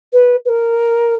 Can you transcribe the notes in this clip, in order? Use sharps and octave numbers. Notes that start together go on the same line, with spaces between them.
B4
B4
A#4